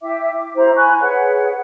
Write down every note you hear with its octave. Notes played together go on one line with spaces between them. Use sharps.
E4 E5 G5 D6
D6
E4 G4 C5 A#5
G#5 B5 C#6 F#6
G#4 B4 C#5 F#5